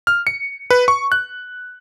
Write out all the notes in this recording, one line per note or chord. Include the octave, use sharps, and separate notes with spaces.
F6
C#7
B4
C#6
F#6